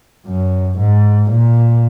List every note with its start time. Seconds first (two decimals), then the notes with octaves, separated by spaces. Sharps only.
0.26 F#2
0.78 G#2
1.30 A#2